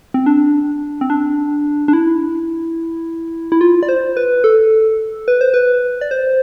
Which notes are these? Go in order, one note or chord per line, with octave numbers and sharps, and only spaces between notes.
C4
D4
C4
D4
D4
E4
E4
F4
D5
C5
B4
A4
B4
C5
B4
D5
C5